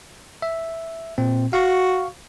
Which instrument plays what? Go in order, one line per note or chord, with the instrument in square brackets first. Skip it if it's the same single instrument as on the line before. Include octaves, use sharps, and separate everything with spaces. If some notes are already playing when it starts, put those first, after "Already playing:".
[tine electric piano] E5
A#2 C4
[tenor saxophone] F#4 [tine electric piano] F5 C#6